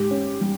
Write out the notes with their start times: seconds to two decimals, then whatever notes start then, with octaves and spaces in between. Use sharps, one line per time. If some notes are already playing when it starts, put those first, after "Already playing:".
Already playing: G#2 G4
0.11 C#4
0.41 G3